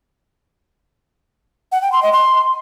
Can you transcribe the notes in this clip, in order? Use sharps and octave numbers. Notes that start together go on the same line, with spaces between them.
F#5
G5
C6
D#5
C6